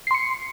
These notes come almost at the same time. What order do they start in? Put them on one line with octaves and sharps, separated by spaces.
C7 C6 C#7